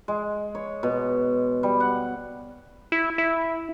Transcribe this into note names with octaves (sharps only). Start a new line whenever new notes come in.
G#3
C#5
B2
G3
F#5
E4
E4